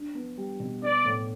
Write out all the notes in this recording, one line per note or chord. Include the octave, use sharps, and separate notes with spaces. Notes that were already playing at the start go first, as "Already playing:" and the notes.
Already playing: D4
B3
G3
B2
B3 D5
A2